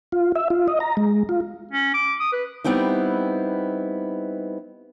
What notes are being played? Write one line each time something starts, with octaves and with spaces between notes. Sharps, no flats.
F4
E5
F4
D#5
A#5
G#3
F4
C#4
D6
D#6
B4
G3 B3 C4 D#4 E4